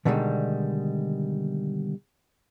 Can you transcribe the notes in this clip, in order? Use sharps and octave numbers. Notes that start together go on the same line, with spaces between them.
B2 D3 D#3 F3 G3 G#3